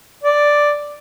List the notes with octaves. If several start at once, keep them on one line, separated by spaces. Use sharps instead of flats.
D5